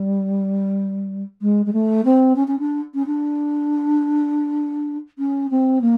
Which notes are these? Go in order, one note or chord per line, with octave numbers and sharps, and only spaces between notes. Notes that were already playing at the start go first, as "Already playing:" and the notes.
Already playing: G3
G#3
G#3
A3
C4
C#4
C#4
D4
C#4
D4
C#4
C4
A#3